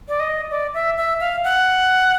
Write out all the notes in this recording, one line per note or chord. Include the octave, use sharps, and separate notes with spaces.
D5
D#5
D5
E5
E5
F5
F#5